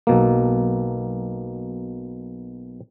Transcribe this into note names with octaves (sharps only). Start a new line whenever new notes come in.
B1 B2 A#3